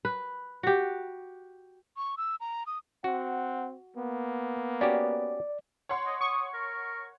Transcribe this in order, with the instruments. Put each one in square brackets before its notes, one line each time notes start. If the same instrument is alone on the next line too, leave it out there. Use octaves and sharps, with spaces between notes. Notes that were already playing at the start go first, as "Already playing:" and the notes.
[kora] B4
F#4 G4
[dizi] C#6
E6
A#5
D#6
[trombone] C4 [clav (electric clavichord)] F#4 [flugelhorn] F#5
[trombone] A#3 [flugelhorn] B3
[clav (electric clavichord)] C#4 F#4 G4 [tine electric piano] D5
[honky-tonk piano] C#5 F#5 C6
[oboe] D#5
[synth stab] C#6 [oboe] D#6
[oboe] A#4